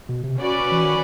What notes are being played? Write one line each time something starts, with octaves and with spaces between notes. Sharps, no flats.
B2
C3
C#4 F#4 B4 D5
E3
D#3